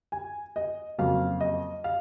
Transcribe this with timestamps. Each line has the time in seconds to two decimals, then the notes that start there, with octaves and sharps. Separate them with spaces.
0.12 G#5
0.56 D#5
0.98 F2 C#3 F#3 A#3 F5
1.41 D#5
1.84 F5